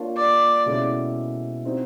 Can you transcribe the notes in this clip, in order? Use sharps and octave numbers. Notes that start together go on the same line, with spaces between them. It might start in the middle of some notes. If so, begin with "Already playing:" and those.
Already playing: A#3 D4 F4 A#4 C#5
D5
B2 G#3 C#4 E4 A4
C4 D#4 F#4